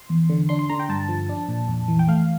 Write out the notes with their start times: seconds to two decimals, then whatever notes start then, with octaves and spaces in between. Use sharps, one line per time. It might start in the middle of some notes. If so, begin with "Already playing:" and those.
Already playing: C6
0.09 E2
0.30 D3
0.49 D4 C6
0.59 C6
0.70 D3 A#5
0.80 G5
0.89 G2 A5
1.09 F3
1.29 D4
1.48 A#2
1.68 F2
1.88 E3
1.99 G5
2.08 A3 F5